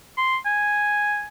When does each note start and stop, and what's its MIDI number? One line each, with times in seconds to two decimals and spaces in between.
0.17 0.37 84
0.46 1.26 80